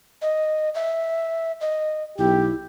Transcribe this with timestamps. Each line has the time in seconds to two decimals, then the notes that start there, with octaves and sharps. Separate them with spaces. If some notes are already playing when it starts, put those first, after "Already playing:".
0.22 D#5
0.75 E5
1.61 D#5
2.18 B1 E4 G4